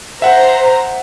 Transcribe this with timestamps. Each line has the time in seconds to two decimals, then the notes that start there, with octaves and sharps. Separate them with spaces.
0.22 C5 E5 F#5 A#5